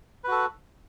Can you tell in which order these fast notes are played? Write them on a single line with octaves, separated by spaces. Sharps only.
B4 F#4 A4